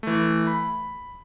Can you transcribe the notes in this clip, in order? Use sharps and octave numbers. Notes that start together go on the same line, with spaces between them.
E3 A3
B5